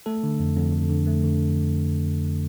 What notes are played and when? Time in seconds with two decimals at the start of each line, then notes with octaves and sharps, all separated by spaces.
0.06 A3 A4
0.23 D3
0.39 F2
0.56 F2
0.73 F2
0.90 D3
1.07 A3
1.24 D3